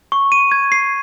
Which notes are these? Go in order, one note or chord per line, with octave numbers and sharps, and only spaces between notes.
C#6
D#7
G#6
C7